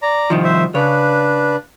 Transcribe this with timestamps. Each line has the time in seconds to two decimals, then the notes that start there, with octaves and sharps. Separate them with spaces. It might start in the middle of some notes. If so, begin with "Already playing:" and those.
0.02 D5 A#5
0.30 C2 D#3 F3
0.44 C5 E5
0.75 C#3 D4 B4 C#5